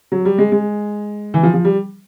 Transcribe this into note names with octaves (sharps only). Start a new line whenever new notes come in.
F#3
G3
G#3
G#3
E3
F3
F3
G3